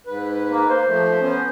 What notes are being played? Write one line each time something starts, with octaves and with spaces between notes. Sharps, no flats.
G#2 B4
A#3
A#3 C5
F3 A3
B3 C#4